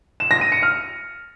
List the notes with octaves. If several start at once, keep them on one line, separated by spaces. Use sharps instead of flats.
E7
A#6
D#7
C#7
F6